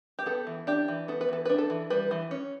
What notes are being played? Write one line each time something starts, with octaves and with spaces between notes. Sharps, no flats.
G4
B3 A4
E3
D4 G4
E3
B3 A4
B4
E3 A4
D4 B4
A4
E3
G3 B4
E3
C#4